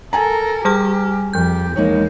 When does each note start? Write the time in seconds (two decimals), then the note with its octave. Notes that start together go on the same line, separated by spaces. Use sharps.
0.13 A4 A#4 G#5 A#5
0.65 G3 G4 G#4 F6
1.33 F2 F3 G4 G6
1.76 E2 G#3 A#3 D#4 C#5